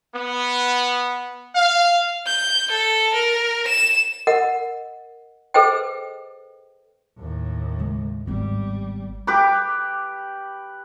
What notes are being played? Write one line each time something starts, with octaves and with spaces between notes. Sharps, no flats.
B3
F5
G6
A4
A#4
E7
A#4 D#5 F#5
G#4 A4 B4 C5 D#5 G5
D#2 A2
C#3 G#3
G#1 G3 B3
G4 B4 D6